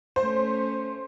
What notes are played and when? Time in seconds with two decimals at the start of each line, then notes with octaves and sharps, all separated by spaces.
0.16 A3 C#4 C5